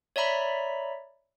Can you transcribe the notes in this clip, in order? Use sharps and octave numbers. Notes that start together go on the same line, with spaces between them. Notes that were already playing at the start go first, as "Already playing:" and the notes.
C#5 D5 E5 A#5 B5 B6